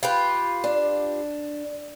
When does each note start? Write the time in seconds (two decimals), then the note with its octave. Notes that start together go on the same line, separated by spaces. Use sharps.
0.03 F4 G4 B4
0.64 D4